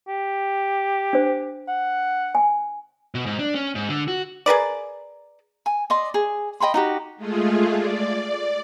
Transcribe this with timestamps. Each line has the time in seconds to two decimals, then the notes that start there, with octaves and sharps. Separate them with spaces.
0.08 G4
1.13 D4 C5
1.68 F#5
2.35 G#5
3.15 B2
3.26 G#2
3.39 D4
3.55 C#4
3.75 G#2
3.89 D3
4.08 F#4
4.46 G#4 A#4 B4 D5
5.66 G#5
5.90 D5 D#5 C6
6.14 G#4
6.60 D#5 G5 B5 C6
6.74 D#4 F#4 G4
7.16 G#3 A3 F4 G#4
7.75 D5